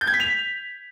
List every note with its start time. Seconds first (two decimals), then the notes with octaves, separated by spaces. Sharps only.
0.01 G6
0.07 G#6
0.14 B6
0.20 F7